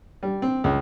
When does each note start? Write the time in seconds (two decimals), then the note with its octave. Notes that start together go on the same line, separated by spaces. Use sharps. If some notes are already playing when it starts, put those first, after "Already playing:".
0.23 G3
0.42 C4
0.64 C#2